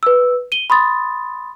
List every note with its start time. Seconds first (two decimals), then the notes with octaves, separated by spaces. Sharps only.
0.03 B4 E6
0.52 D#7 G7
0.70 B5 C6 D#6 A6